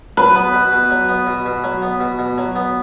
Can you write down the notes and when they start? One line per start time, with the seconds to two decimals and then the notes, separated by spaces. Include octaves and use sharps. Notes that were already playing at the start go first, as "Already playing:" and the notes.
0.17 F#3 B4
0.36 B3
0.54 B2
0.72 B2
0.91 F#3
1.09 B3
1.27 B2
1.45 B2
1.64 F#3
1.82 B3
2.00 B2
2.19 B2
2.38 F#3
2.56 B3